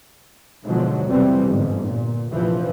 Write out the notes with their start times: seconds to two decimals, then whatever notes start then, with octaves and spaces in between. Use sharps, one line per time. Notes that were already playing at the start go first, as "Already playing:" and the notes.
0.66 G#2 B2 D3 F3 F#3
1.07 C2 F2 B2 E3 G3 C4
1.46 G1 G#2
1.85 A#2
2.31 F1 A#1 E3 F3